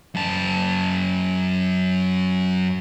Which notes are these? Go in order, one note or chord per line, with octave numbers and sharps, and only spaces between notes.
F#2 A5